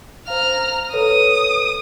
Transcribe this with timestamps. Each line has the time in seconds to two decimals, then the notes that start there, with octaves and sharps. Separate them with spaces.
0.28 C5 F5 A#5 F6
0.94 A4 B4 C#5 D#6